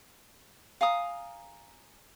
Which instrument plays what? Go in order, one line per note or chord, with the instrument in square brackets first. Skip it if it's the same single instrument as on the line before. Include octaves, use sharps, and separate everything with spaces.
[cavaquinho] F5 G#5 A#5 D#6